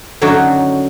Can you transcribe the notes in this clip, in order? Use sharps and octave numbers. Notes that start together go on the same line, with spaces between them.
D3 F#3 C#4 D#4 F#4